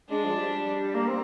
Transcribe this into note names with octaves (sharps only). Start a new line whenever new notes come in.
G#3 D4
F3
G3
A#3
C4